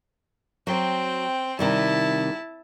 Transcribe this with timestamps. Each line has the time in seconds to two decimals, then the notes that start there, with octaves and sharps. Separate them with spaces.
0.67 F#3 C4 G5
1.59 C3 D#3 G3 E4 A5